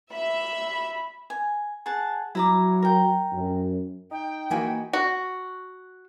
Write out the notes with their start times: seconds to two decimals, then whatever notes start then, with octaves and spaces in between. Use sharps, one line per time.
0.12 E5 B5
1.30 G#5
1.86 G#4 F#5 A5
2.35 F#3 E4 A#5 D6
2.82 A#4 G5
3.32 F#2
4.11 D#4 G5
4.50 E3 A#3 F#4 G#5 B5
4.93 F#4